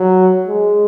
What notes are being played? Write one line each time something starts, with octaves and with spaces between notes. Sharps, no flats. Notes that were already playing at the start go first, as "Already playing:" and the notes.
Already playing: F#3
G#3